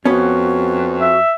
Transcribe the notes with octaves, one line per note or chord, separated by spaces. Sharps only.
F2 B3 C#4 F#4
E5